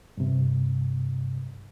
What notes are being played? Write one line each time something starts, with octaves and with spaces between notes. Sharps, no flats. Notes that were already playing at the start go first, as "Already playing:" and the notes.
G2 C3